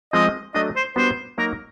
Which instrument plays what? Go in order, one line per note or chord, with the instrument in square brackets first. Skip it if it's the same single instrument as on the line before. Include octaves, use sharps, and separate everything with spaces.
[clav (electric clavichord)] F3 G#3 C4 [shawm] D#5
[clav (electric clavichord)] F#3 A3 D4 [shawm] D#5
[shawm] C5
[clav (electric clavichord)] G3 B3 D4 F#4 [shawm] C5
[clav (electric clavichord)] F#3 A#3 D#4 F#4 [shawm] A#4